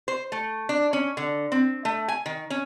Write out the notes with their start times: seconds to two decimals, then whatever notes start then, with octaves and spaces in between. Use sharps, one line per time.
0.08 C5
0.32 A3
0.69 D4
0.93 C#4
1.17 D3
1.52 C4
1.85 A3
2.08 G#5
2.26 D#3
2.50 C#4